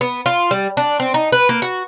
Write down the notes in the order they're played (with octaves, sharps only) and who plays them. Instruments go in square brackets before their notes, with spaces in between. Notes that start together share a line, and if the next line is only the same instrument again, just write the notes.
[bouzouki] B3
F4
G3
D4
C4
D#4
B4
A#3
F#4